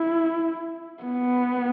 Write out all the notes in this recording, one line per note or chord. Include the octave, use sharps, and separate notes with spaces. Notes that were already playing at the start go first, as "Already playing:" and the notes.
Already playing: E4
B3